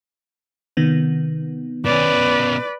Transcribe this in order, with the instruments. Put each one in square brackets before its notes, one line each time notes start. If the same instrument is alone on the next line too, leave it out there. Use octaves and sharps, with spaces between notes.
[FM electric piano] C3 D#3 B3
[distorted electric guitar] B2 C#4 [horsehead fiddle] B4 D5